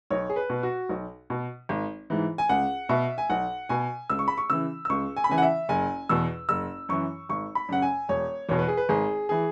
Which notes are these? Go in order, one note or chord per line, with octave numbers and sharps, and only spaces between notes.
B1 C#5
G#4
B4
B2
F#4
B1
B2
G#1
G#2 E3
G#5
C#2 F#5
B2 E5
G#5
B1 F#5
B2 G#5
C#2 E6
C#6
B5
C#6
C#3 E3 E6
E6
C#2 C#6
G#5
B5
C#3 E3 G#5
F#5
E5
F#1 G#5
E2 B2 E6
F#1 E6
F#2 E3 C#6
G#1 C#6
B5
F#2 C#3 F#5
G#5
E1 C#5
E2 B2 C#5
B4
G#4
B4
G#1 G#4
E3 G#4